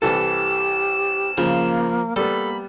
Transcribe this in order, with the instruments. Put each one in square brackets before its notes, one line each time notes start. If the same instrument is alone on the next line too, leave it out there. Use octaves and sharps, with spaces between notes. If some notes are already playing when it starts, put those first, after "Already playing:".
[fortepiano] C2 E3 A4 [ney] G4 [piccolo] E7
[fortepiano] C#3 [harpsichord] F3 [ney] A#3
[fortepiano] G3 B3 [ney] A#3 [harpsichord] A4 [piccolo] B5